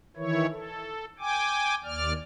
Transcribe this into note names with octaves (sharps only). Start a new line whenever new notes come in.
D#3 E3 E4 C#5
A4
G5 G#5 D6
D#2 D5 F6